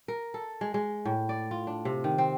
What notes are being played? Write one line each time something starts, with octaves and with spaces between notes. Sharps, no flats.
A#4
A4
G#3
G#3
A2
D5
F4
D4
C3
D#3
C4